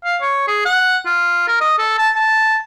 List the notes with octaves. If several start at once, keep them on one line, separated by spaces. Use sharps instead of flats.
F5
C#5
G#4
F#5
F4
A#4
D#5
A4
A5
A5